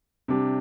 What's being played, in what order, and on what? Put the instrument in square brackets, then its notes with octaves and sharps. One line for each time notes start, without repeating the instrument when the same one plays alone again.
[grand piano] C3 G3 D4 G4